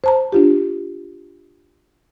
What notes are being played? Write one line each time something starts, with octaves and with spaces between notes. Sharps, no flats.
C5 A5 A#5
D4 F4 G4